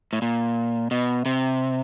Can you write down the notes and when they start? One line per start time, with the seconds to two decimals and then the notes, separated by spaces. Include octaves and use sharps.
0.13 A2
0.22 A#2
0.91 B2
1.26 C3